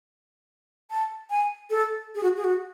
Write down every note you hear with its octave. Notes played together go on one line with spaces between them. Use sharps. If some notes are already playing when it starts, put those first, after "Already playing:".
A5
G#5
A4
G#4
F#4
G#4
F#4